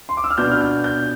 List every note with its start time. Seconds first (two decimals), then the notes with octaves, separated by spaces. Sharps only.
0.09 C6
0.17 D6
0.24 E6
0.31 F6
0.38 B2 B3 D4 G6
0.52 F6
0.61 G6
0.84 G6